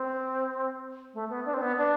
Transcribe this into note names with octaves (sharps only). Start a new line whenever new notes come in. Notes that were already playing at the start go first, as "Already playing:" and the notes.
Already playing: C4
A3
B3
D4
C4
B3
D4